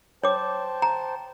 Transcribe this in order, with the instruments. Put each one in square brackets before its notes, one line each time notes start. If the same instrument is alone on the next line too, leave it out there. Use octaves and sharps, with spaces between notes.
[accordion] C5 G5 A5 [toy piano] C#5 D6
[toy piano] A#5